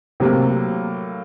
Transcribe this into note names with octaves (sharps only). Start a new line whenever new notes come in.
A2 C3 F#3 A#3